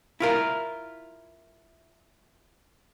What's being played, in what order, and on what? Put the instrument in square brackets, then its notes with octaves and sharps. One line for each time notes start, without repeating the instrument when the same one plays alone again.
[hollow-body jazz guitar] E4 F4 A#4